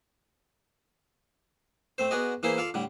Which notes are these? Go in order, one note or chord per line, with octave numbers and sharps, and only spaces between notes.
A3 C4 C5
B3 F#4 G#4 D5 D#5
E3 A#3 E4 G#4 C5 C6
F4 A4 D5 F5
A2 D3 G3